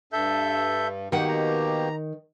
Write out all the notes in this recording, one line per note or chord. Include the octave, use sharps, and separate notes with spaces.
G2 A4 E5 G6
B2 D#3 A#3 G4 F#5
A#5